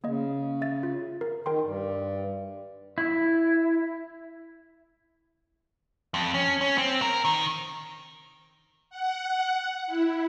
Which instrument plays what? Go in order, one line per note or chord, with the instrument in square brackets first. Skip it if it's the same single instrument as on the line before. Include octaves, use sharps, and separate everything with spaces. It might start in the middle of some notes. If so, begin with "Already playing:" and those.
[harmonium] C#3 [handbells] A#3 D#5
[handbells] E5 A6
F4
A#4
[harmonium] D#3 [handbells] A#4 G5 C6
[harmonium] G2
[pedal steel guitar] E4
[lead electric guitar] F2
C#4
C#4
C4
A#4
D#3
[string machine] F#5
E4